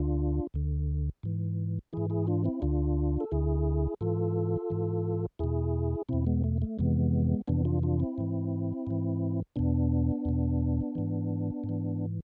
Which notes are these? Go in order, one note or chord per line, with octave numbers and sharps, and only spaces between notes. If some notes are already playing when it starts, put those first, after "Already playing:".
Already playing: D2 D3 D4 F4
D2 D3
G#2 E3
G#2 E3 E4 G#4
E4 G#4
D4 F4
C4 E4
D2 D3 D4 F4
A4
D2 D3 E4 G#4
G#2 E3 F4 A4
G#2 E3
E2 B2 E4 G#4
E2 B2 C4 E4
G#3 B3
A3
A3
F2 C3 E3 G#3 B3
F2 C3 E3 B3 D4
D4 F4
D4 F4
C4 E4
G#2 E3
G#2 E3
E2 B2 B3 D4
E2 B2
G#2 E3
G#2
E3